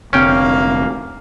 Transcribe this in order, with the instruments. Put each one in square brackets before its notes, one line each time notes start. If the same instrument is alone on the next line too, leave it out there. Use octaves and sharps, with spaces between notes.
[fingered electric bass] F1 D3 C4 [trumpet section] A#3 F5 [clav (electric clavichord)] C#4 G5